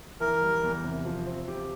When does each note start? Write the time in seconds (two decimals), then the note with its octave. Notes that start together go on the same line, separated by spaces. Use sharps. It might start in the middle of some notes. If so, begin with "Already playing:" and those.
0.20 E3 A#4
0.42 G3
0.63 E2
0.84 C3
1.05 F3
1.27 C4
1.48 G4